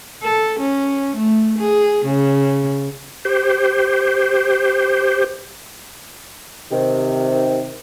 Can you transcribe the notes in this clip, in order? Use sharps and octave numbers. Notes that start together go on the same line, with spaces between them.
A4
C#4
A3
G#4
C#3
G4 C5
C3 D#3